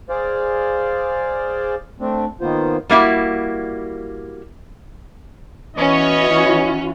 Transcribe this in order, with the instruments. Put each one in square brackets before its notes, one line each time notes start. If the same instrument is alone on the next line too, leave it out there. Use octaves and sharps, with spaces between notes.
[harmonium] G#4 C5 D5 F5
A3 C4 D4
D#3 A#3 B3 F4 C5
[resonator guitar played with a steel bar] G3 A#3 E4 F#4
[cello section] E3 E4 F#4 [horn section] B3 C#5 [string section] C#4 [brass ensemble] D#5